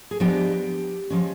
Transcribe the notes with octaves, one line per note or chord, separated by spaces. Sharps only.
G#4
F3 G#3 B3 D4 G4
F3 G#3 C#4